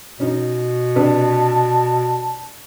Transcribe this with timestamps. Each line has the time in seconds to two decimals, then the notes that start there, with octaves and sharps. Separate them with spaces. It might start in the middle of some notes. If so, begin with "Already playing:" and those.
0.20 B2 C#4 D#4
0.96 C3 D4 B4 A5